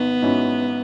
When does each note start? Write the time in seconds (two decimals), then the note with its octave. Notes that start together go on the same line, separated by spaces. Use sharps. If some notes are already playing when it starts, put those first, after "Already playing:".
Already playing: G#1 B3
0.22 G#2 F#3 C#4 E4